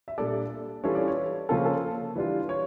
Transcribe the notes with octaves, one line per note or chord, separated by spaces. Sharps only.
E5
A#2 G3 A#3 D4 A4 D5
E3 G3 C#4 F4 A4 C#5
D5
C#5
C#3 F3 A#3 C#4 F4 A4
A4
E3 G3 D4 F4
C#5